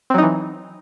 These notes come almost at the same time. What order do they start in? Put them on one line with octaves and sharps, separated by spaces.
C4 F#3 D#4 E3